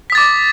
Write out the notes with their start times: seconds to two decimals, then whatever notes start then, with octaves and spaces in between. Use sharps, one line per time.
0.10 B6
0.12 D#6
0.15 A6
0.18 D6